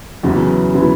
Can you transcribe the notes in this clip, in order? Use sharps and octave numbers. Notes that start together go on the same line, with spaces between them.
E2 C#3 F#3 B3 E4
C#3 F#3 B3 E4